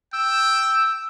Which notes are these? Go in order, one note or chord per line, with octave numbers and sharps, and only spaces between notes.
G5 E6